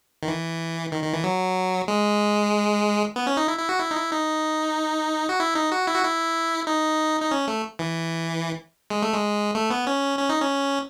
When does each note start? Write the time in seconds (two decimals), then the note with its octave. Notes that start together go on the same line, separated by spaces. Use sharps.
0.23 D#3
0.28 E3
0.92 D#3
1.03 D#3
1.13 E3
1.24 F#3
1.88 G#3
3.16 B3
3.27 C#4
3.37 D#4
3.48 E4
3.58 E4
3.69 F#4
3.80 E4
3.91 D#4
3.96 E4
4.12 D#4
5.29 F#4
5.40 E4
5.55 D#4
5.72 F#4
5.87 E4
5.96 F#4
6.03 E4
6.67 D#4
7.21 D#4
7.31 C#4
7.48 A3
7.79 E3
8.90 G#3
9.02 A3
9.14 G#3
9.55 A3
9.70 B3
9.87 C#4
10.19 C#4
10.29 D#4
10.40 C#4